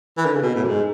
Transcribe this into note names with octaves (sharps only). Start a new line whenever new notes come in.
E3
D3
C#3
B2
A2
F#2
G#2